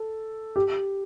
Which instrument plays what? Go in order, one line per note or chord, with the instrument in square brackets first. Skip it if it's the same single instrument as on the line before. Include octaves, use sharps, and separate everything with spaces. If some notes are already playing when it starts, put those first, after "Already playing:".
Already playing: [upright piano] A4
G4